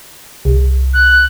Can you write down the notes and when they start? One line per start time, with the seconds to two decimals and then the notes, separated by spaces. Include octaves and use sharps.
0.45 C2
0.94 F#6